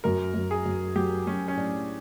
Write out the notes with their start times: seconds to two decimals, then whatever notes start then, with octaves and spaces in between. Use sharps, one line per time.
0.04 F#2 A#4
0.34 F#2
0.51 G#4
0.66 F#2
0.95 F#3 G4
1.27 F#3 C#4
1.48 C#4
1.56 A2 D4